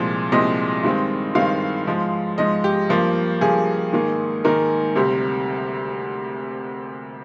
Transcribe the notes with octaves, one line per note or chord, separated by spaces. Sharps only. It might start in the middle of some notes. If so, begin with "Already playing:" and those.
Already playing: C2 A#2 F3 G#3 C4
C2 A#2 F3 G#3 C4 D#5
G2 D#3 G#3 C4
G2 D#3 G#3 C4 F5
G#2 F3 G#3
G#2 F3 G#3 D#5
G4
G2 F3 A#3
G2 F3 A#3 G#4
G#2 D#3 A#3
G#2 D#3 A#3 A#4
D2 C3 G3 C4